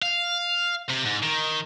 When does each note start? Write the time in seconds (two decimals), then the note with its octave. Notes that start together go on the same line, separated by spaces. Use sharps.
0.02 F5
0.89 C3
1.05 G#2
1.23 D#3